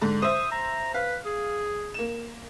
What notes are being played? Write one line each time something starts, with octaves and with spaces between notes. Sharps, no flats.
G#2 D3
C5 E5 D#6
A#5
B4 F5
G#4
A#3 E7